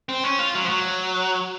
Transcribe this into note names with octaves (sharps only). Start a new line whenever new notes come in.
C4
C#4
F4
F#3
F3
F#3